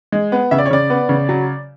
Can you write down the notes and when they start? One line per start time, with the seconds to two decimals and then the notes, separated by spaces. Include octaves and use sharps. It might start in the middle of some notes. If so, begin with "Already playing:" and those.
0.12 G#3
0.32 B3
0.51 C#3 E5
0.58 D5
0.66 C#5
0.71 C#3 D5
0.90 B3
1.09 C#3
1.29 F#3